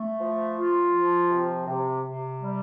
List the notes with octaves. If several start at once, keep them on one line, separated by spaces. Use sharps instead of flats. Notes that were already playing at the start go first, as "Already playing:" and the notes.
Already playing: A3
F3
F4
F3
C3
C3
C3
G3